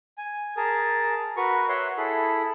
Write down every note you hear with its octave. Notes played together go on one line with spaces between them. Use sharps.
G#5
G#4 A#4 A5
F#4 A#4 B4 C#6
C#5 E5 F#5 C6
E4 G#4 A4 B5